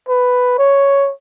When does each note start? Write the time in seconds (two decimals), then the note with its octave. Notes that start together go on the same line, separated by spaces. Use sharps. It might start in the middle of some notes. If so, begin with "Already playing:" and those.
0.09 B4
0.59 C#5